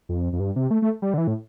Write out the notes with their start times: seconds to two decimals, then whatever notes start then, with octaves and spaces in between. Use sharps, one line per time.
0.09 F2
0.33 F2
0.40 G2
0.56 C3
0.71 A3
0.82 A3
1.02 G3
1.14 D3
1.18 E3
1.27 A2